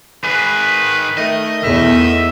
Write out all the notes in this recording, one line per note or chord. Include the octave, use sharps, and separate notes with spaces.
D#3 G#4 B4
D#3 A3 D#5
E2 A2 D#3 A3 E5